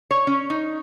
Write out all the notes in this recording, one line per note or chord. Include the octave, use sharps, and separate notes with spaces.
C#5
C#4
D#4